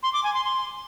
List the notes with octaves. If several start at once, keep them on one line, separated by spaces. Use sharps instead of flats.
C6
D6
G#5
C6
C6